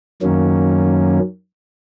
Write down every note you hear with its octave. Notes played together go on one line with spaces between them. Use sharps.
F#2 D#3 F#3 A#3 C#4